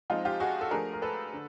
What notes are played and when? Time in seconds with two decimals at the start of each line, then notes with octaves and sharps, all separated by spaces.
0.10 F3 G#3 C4 D#4 F4
0.25 F4 G4
0.40 F#4 G#4
0.61 A4
0.71 F3 A3 D4 G#4 A#4
0.93 A#4
1.02 A4 B4
1.33 D3